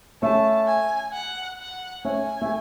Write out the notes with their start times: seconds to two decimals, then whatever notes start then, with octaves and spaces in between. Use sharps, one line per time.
0.22 A3 C#4 A5
0.67 G#5
1.13 F#5
1.59 F#5
2.05 A3 C#4 G#5
2.42 A3